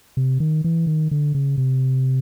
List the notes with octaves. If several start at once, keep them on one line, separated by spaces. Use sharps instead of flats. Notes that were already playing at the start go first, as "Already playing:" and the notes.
C3
D#3
E3
D#3
D3
C#3
C3